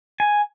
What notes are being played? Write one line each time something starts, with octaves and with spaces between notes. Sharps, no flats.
G#5